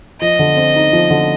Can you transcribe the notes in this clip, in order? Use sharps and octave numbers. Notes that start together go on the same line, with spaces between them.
F3 D#5
D3
C4
D#4
F3
D3